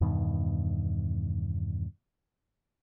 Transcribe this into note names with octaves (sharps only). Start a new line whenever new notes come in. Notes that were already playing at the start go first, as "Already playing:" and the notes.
E2 G2 B2 D#3